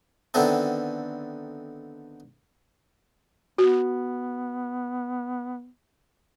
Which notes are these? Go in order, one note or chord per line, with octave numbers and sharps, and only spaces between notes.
D3 D#3 B3 C4 E4 A4
B3 F#4